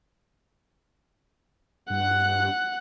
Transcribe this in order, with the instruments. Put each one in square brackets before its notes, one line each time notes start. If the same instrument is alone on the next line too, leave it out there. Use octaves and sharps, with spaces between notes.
[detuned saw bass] G2 [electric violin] F#5 F#6